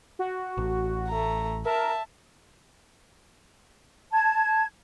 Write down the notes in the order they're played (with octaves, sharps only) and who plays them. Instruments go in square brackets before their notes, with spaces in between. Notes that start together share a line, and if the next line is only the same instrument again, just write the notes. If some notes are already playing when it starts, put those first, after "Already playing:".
[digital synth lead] F#4
[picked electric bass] A1
[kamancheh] A3 A#5
[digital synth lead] A#4 [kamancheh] E5 A5
[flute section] A5 G#6